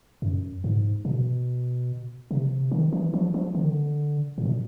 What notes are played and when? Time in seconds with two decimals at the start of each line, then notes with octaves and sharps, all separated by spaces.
0.22 F#2
0.64 G#2
1.05 B2
2.31 C3
2.71 D#3
2.92 E3
3.14 F3
3.34 F3
3.55 D3
3.63 D#3
3.69 D3
4.38 A2
4.45 A#2